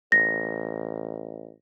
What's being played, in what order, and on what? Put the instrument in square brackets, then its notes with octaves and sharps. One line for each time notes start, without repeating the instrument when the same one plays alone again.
[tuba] A1 [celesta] A#6